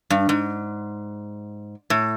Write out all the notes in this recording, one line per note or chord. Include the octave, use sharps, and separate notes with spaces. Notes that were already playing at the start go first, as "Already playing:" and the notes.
G2
G#2
A2